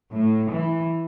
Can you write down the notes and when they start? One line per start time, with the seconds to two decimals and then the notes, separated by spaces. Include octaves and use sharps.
0.13 A2
0.51 E3